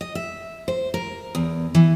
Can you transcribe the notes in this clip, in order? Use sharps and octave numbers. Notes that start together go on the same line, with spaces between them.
D#5
E5
C5
A#4
E2
E3